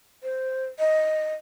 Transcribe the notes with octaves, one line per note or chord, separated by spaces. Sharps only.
C5
D#5